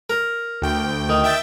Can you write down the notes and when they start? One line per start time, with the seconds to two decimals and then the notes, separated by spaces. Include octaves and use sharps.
0.10 A#4
0.62 D2 G5
1.09 D#3
1.24 E5 G5 A6